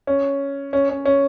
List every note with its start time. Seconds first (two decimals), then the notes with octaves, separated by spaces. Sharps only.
0.07 C#4
0.73 C#4
0.89 C#4
1.05 C#4